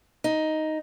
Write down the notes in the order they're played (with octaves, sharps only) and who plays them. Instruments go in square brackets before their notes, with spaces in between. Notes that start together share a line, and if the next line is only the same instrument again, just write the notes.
[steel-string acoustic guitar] D#4